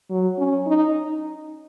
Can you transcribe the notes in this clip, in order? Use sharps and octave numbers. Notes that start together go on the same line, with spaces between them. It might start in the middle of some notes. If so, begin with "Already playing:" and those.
F#3
C#4
D#4